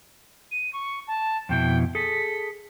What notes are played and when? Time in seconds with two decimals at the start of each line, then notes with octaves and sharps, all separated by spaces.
0.51 D#7
0.73 C#6
1.07 A5
1.49 F2 B2 E4 G5
1.95 G#4 A4 B6